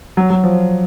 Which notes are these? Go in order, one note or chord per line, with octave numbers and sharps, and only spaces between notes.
F#3
F#3
F3